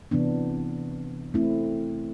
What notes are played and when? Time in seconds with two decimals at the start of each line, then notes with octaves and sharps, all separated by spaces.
0.11 C3 E3 B3 D4
1.34 A3 C4 E4